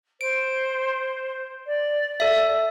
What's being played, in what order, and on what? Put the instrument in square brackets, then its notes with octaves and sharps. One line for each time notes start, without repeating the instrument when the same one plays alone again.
[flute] C5 [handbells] D7
[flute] D5
[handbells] A4 E5